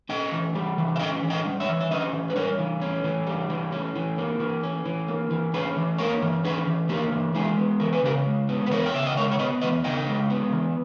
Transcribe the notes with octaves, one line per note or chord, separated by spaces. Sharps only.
C#4 D#5 G5
E3
G3
E3
E5
C#4 D#5 G5
E3
D#5 G5
G3
C#5 E5
E3
E5
C#4 B4 D#5
E3
B4
G3 A#4 C#5
E3
C#4
E3
G3
E3
C#4
E3
A#3
E3
C#4
E3
A#3
E3
C#4 G#4 B4
E3
A#3 A#4 C#5
E3
C#4 G#4 B4
E3
A#3 G4 A#4
E3
G#3 E4 G#4
B3
E3 A#4
B4
C#3 G4 A#4
G#3
B3
B4
E3 A#4 C#5
G5
C#3 E5
D#5
G#3 A#4 C#5
C#5
B3 B4 D#5
E3 B4 D#5
C#3 D#5 G5
G#3
B3
E3